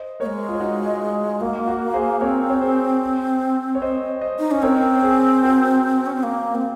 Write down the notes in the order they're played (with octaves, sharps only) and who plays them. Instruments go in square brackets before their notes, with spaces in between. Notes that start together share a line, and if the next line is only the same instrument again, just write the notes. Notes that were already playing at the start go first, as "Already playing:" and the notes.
Already playing: [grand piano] C5 D#5
[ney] A#3 [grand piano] A#4 C#5
[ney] G#3
[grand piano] F4
D#4 F#4
[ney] A#3 [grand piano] F#4 A#4
[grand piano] F#4 A#4
G#4 C5
[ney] C4 [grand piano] A#4 C#5
[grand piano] C#5
G#4 C5
C#5
C5 D#5
C5 D#5
[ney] D#4
[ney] C#4 [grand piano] D#5
[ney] C4 [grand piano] A#4 C#5
[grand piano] G#4 C5
F#4 A#4
[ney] C#4
C4
A#3
C4